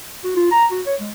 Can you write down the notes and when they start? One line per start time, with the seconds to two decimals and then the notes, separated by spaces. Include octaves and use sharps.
0.24 F#4
0.36 F4
0.52 A#5
0.72 F#4
0.87 C#5
1.00 G#3